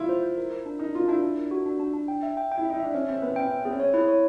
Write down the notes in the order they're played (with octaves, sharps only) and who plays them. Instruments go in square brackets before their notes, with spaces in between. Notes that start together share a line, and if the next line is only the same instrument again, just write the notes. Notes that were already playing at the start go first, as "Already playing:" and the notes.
Already playing: [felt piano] E4 F4
[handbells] C5
C5
A#4
A#4
D4
[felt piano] D#4 [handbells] A#4
[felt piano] F4 [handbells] F#4
[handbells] D4 [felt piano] E4
[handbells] D4
A#4
F#4
D4
D4
D4
G5
E5
G5
G5
[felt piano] E4
[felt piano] D#4 [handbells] E5
[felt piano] D4 [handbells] E5
[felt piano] C#4 [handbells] E5
[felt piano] C4 [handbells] E5
[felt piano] B3 [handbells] B4
[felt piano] C#4 [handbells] G5
[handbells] E5
[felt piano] B3 [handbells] G#4
[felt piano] C#4
[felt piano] C4 [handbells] C#5
[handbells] E4
C#5